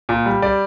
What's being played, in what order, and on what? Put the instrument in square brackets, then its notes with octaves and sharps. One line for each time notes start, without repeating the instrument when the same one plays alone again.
[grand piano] A#2
G3
G3 D5